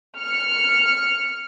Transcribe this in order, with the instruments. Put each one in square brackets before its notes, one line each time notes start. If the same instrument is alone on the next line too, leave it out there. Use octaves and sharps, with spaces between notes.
[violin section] F6 C#7